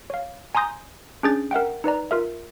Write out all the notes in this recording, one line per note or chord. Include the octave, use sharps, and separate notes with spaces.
C#5 F5
G#5 A#5 C6 D#6 G6 A#6
C#4 D4 G#4 G6 A6
A#4 E5 F#5 G5
D#4 B4 D5 A#5
F4 A#4 E5